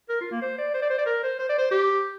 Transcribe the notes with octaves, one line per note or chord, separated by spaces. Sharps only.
A#4
F4
A#3
C5
D5
C5
D5
C5
D5
A#4
C5
C5
D5
C5
G4